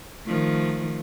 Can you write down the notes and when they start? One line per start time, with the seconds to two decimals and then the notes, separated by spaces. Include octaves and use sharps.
0.25 D#3 F3 A3